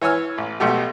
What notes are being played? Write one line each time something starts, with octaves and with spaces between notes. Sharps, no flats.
E3 C#5 G#5 E6 F6
A1
B1 B2 A3 G4